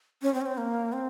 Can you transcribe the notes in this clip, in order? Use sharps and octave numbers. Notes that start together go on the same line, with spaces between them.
C#4
C4
C#4
C4
A#3
C4